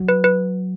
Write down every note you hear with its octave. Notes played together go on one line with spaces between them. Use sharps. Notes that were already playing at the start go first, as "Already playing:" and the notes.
Already playing: F#3
B4
B4